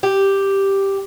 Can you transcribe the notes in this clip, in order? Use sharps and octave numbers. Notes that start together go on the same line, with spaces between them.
G4